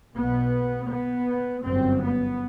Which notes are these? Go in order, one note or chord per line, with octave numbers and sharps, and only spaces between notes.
B1 B2 B3
B3
G1 F#2 C4
B3